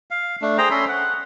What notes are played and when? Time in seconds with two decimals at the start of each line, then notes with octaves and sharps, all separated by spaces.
0.11 F5
0.42 A3 D4
0.58 G#4 C5 G5 A#5
0.71 C#4 A4 B5 C6
0.89 F#5